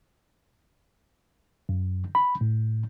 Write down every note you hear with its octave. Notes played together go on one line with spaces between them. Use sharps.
F#2
B5
A2